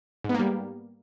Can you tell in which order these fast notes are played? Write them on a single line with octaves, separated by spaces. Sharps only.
G#2 B3 A#3 G3